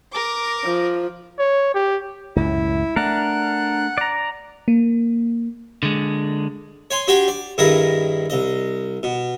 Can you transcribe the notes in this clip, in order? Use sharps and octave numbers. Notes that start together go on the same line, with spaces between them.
A#4 D6
F3
C#5
G4
C#2 F#2 A2 E4
A3 D4 A#4 F#5
D5 A#5
A#3
D3 G#3
C#5 G#5 C6
D4 F#4 G4 G5 G#5 C6
D5
G2 D#3 E4 G#4 A#4 D#6
C2 D#5
B2